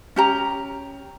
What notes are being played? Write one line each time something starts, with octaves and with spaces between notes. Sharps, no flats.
C#4 G4 A#5